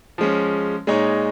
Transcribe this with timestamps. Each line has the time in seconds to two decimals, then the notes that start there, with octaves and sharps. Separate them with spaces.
0.18 F3 G#3 C#4
0.87 A#2 G#3 D#4 C#5